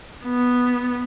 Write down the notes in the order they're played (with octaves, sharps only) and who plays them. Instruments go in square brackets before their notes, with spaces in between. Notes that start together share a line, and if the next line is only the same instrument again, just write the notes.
[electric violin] B3